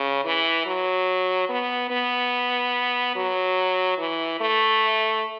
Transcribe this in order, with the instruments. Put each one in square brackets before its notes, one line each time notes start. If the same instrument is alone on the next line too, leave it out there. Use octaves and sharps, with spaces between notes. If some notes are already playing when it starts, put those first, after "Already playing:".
Already playing: [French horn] C#3
E3
F#3
B3
B3
F#3
E3
A3